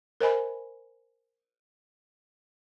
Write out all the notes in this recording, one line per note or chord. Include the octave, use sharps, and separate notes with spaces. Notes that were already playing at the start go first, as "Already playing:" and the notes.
A#4 C5 D#5 G#5 B5